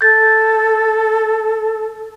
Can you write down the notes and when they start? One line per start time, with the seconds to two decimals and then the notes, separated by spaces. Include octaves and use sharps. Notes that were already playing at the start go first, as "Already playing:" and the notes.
0.01 A4 G6 A6